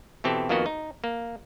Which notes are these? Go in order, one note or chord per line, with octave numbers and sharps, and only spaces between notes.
B2 E3 C4 G4 A4
F2 D#3 A#3 B3 F#4 D#5
D#4
A#3